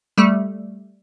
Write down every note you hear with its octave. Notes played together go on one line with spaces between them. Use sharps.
G3 A3